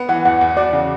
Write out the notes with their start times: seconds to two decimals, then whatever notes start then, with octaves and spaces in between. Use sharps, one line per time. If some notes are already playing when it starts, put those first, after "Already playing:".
Already playing: B3
0.09 E3 F#5
0.25 E2 F#5
0.41 E2
0.57 F#4 D5
0.73 C#3